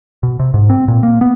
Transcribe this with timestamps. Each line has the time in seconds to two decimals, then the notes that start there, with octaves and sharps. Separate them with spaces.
0.23 B2
0.40 C3
0.54 G#2
0.70 C4
0.88 A#2
1.03 A#3
1.21 B3